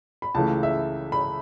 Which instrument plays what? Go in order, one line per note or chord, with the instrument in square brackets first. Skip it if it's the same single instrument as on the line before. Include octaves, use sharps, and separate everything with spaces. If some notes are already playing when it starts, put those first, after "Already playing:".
[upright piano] B5
C#2 C#3 E3 A3 A5
E5
B5